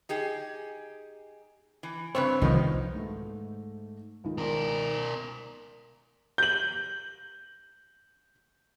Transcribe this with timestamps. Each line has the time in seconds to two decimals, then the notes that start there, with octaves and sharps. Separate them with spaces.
0.09 D#4 G4 G#4
1.83 E3
2.15 G2 C#3 C4 B4 C#5
2.42 C2 D#3 F3 D#4
2.95 G#2 A3
4.24 C#2 D#3
4.37 B2 A#4
6.38 G6 F#7